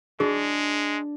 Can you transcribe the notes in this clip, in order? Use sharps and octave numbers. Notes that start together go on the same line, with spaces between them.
G#3 D4 F#4 G#4